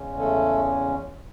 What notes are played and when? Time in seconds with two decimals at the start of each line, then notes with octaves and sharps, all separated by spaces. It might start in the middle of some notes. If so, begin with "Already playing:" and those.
Already playing: E2 C#3 G#3 C#4
0.19 A3 A4